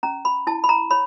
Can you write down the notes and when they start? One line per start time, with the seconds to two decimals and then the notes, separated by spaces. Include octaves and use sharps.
0.03 C#4 A#5
0.25 B5
0.47 E4 A5
0.64 B5
0.69 A#5
0.91 C#5 B5